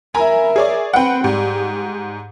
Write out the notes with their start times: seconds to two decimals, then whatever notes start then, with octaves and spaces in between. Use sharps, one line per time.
0.15 A#4 E5 G#5 A#5 B5
0.56 G#4 C#5 D5
0.93 C4 B4 F#5 G5
1.24 G#2 G3 G4